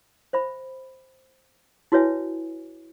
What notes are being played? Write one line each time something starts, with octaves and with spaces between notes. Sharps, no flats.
C5 E5 B5
E4 F#4 B4 C#5 E5 G#5